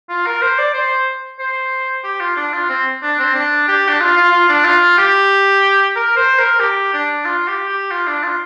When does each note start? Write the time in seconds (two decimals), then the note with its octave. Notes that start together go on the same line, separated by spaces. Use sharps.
0.09 F4
0.26 A#4
0.42 C5
0.58 D5
0.74 C5
1.39 C5
2.04 G4
2.20 F4
2.36 D4
2.53 F4
2.69 C4
3.02 D4
3.19 C4
3.35 D4
3.68 G4
3.88 D4
4.00 F4
4.16 F4
4.32 F4
4.49 D4
4.64 F4
4.98 G4
5.96 A#4
6.16 C5
6.38 A#4
6.60 G4
6.93 D4
7.25 F4
7.48 G4
7.69 G4
7.91 F4
8.07 D4
8.23 F4